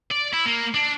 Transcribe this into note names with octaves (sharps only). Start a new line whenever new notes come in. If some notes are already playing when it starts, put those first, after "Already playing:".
D5
E4
A#3
D4